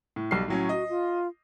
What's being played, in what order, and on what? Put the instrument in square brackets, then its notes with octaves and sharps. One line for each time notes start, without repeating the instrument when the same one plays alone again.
[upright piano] A2
B1 G3 C7
A2 F#3 C#4
[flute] F#4 [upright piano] D#5
[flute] F4